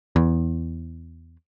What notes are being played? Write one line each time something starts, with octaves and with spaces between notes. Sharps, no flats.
E2